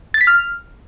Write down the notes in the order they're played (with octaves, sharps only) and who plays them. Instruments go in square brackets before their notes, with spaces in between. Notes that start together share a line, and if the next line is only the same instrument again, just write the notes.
[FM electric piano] A6
B6
F6